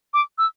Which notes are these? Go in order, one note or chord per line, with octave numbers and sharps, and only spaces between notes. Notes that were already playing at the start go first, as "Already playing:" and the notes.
D6
E6